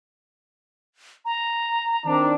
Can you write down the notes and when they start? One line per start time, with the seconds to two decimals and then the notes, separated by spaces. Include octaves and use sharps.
1.25 A#5
2.06 D#3 C4 D4